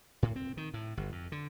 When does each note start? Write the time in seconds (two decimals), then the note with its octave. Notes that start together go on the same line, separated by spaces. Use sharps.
0.23 A2
0.36 C4
0.57 D#3
0.74 A2
0.97 G1
1.12 F2
1.32 D3